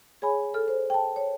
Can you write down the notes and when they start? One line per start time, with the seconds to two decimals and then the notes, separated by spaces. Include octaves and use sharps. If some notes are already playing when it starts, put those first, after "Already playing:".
0.22 G#4 C#5 G#5 B5
0.54 A4 F6
0.68 C5
0.90 G5 A5
1.16 C#5